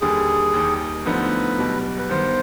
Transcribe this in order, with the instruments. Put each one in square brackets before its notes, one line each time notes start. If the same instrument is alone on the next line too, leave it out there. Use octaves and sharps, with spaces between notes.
[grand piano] D#2 D3 G3 [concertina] G#4
[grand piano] D#2 D#3 G3
[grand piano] D2 D3 F3 B3 D#4 [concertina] B4
[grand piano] B1 B2 G3
[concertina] B4
[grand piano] G2 D#3 B3 [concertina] C5